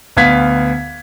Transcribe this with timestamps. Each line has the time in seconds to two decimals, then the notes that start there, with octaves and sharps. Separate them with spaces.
0.17 D2 B3 F5 G#6 B6